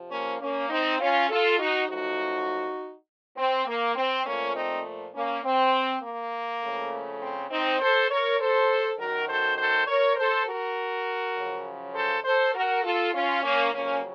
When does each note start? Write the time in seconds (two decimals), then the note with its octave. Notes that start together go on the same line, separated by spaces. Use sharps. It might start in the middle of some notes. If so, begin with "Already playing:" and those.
Already playing: C3 F3
0.10 A#3 C#4
0.40 A#3 C#4
0.70 C4 D#4
1.00 C#4 F4
1.30 F4 A4
1.59 D#4 F#4
1.88 F#2 F3 A3 D#4 F#4
3.37 C4
3.66 A#3
3.96 C4
4.25 A#2 F3 A3 A#3 C#4
4.55 C4 D#4
5.14 A#3 C#4
5.44 C4
6.02 A#3
6.62 F2 C#3 A3
7.21 C4
7.50 C4 D#4
7.81 A4 C5
8.10 A#4 C#5
8.40 A4 C5
8.99 F#2 D#3 F#3 F#4 A#4
9.28 A4 C5
9.58 A4 C5
9.87 A#4 C#5
10.17 A4 C5
10.46 F#4 A#4
11.36 F#2 C#3 F3
11.95 A4 C5
12.24 A4 C5
12.54 F#4 A#4
12.83 F4 A4
13.13 C#4 F4
13.43 A#3 C#4
13.72 F2 C#3 F#3 A#3 C#4